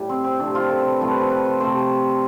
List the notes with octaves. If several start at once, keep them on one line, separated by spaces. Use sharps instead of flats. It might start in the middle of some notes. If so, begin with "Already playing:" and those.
Already playing: A2 G3
C4
C4
C3 F3 A3 D4
F4
A4
C5
B4
C3 F3 A3 C5
B4
A4
B4
C5
C3 F3 A3 C5